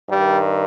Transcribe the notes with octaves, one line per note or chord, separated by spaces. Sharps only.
G2 D#3 G3